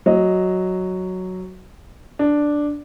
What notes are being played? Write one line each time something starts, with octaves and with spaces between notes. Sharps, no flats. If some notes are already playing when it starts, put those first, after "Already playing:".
F#3 D#5
D4